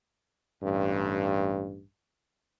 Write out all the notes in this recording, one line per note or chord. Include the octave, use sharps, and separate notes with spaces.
A1 G2